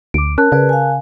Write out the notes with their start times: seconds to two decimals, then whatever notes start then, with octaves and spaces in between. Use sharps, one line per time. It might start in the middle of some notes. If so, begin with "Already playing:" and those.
0.14 D2 D6 D7
0.38 C#4 A#4 A5 F#6
0.52 C#3 G#4 B4 D5
0.69 F5 G#5